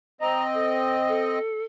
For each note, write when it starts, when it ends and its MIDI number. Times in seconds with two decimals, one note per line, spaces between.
0.21 1.39 60
0.21 1.39 75
0.21 0.43 82
0.54 0.96 69
1.08 1.63 69